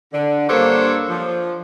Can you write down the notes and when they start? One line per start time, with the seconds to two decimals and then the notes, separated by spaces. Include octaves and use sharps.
0.13 D3
0.49 G2 A#3 D4 A4 C5 C#5
1.09 F3